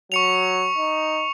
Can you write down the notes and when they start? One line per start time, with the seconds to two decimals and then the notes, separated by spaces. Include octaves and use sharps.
0.12 F#3 C#6 C#7 F7
0.78 D#4